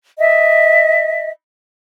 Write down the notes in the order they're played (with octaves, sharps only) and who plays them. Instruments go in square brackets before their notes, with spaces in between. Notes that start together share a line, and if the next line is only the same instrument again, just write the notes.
[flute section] D#5 E5